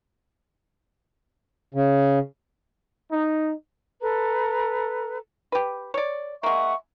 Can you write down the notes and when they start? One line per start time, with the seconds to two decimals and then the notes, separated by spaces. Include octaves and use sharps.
1.74 C#3
3.11 D#4
4.01 A4 B4 A#5
5.52 G4 B4
5.94 C#5 D5
6.43 G#3 A#3 E5 F#5 C#6